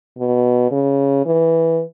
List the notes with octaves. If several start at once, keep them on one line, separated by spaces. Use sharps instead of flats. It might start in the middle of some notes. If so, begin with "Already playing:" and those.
B2
C#3
E3